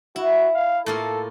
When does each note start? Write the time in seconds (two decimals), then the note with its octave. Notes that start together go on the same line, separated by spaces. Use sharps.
0.16 E4 F#4
0.54 F5
0.86 A2 A#3 F4 A4